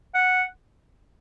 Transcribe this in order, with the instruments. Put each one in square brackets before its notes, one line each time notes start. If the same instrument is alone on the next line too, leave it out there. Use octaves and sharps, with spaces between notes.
[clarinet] F#5